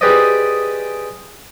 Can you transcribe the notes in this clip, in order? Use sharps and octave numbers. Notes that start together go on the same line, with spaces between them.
G4 G#4 B4 C5 D5 D#5